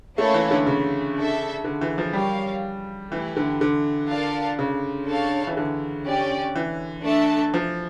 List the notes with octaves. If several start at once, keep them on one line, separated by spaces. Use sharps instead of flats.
A3 A#3 C#4 E4 A4 C#5
E3
D3
C#3
D4 A4 E5
D3
E3
F3
G3 G4 A#4 C#5 F5
E3 A3 E4 G4
D3
D3
F4 A#4 D5 F5 A5
C#3
D4 A4 C#5 F5 A5
E3
D3
C#4 G4 D5
E3
A3 D4 A4 E5 A5
F3